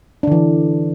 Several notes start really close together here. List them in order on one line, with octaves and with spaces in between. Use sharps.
D4 D3 E3